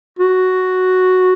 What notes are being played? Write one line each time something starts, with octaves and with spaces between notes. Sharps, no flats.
F#4